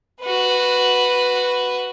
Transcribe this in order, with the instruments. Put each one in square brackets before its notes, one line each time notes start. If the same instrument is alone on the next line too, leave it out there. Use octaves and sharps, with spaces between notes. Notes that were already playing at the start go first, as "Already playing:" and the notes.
[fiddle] F#4 B4